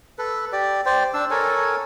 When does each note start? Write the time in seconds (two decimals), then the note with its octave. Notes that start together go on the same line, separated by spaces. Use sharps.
0.18 A4 B4
0.53 G4 D5
0.86 C5 D5 G5
1.14 D4 E6
1.31 A4 A#4 C#5 G#5